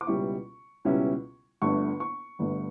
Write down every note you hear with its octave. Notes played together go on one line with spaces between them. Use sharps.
D6
C#2 B2 G3 C#4 E4 C#6
C#2 B2 G3 C#4 E4
G1 G2 D3 A3 C#6
C#6
G1 G2 D3 A3